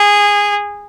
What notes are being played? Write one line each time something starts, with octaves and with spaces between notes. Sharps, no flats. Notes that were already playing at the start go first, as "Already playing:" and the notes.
Already playing: G#4